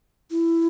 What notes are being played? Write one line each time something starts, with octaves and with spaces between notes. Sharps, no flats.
E4